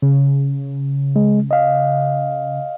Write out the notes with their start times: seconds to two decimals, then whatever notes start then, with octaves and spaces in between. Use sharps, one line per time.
0.02 C#3
1.16 G#3
1.51 D#5 F5